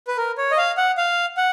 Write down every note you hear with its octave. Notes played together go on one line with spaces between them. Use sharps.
B4
A#4
C#5
D#5
F5
F#5
F5
F#5